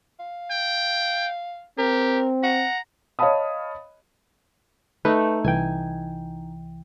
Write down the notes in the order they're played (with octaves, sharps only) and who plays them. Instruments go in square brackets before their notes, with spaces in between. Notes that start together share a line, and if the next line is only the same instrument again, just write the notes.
[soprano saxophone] F5
[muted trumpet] G5
[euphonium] C4 [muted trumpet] G4 [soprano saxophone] A#4
[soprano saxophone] F#5 [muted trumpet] A#5
[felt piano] C#5 D#5 F5 A5 B5 D#6
[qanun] A3 D#4 [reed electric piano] B4
[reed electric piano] C2 E3 G5 [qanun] G#5